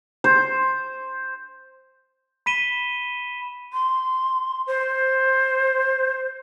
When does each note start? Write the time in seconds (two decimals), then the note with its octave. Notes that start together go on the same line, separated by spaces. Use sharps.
0.24 C5
2.46 B5 B6 D#7 E7 G7
3.73 C6
4.67 C5